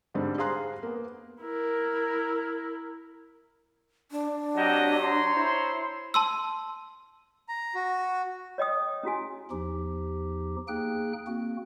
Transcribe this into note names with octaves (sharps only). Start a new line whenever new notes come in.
G#2 D3 G3 C4
G#4 C5 F5 A#5 C6 F#6
A#3 B3
E4 A#4
D4
F#3 C4 G4 D#5 F#5
C#5 A#5 C6
E4 C5
A5 C6 E6
A#5
F#4
C#5 D#5 G5 D#6
C#4 E4 F#4 G#5
E2 F3 D#4 G4
A#3 D#4 G#4 G5 F#6
A#3 C4 F#4